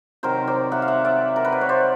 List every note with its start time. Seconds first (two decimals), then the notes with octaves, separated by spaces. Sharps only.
0.23 C3 D#3 F#3 A#4 C5
0.47 C5 D5
0.72 E5 F#5
0.82 F5
0.88 E5 F#5
1.05 D5 E5
1.36 A#4
1.44 B4
1.52 C5
1.61 C#5
1.69 C5 D5